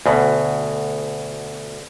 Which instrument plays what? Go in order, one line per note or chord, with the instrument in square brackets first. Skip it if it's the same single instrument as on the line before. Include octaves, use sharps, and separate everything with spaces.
[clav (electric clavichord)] D2 B2